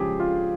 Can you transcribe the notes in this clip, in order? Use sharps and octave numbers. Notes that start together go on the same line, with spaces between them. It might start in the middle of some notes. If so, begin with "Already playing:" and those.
Already playing: C#3 F3 G#3 G4 G#4
F4